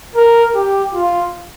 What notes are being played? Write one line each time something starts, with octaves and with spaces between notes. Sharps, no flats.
A#4
G4
F4